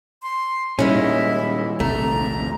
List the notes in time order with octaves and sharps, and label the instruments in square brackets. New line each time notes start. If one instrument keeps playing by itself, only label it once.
[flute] C6
[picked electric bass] A#2 G3 [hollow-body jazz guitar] D#3 G#3 C#4 [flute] E4
[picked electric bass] A#1 D#2 C3 [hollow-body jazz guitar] A3 [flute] A#5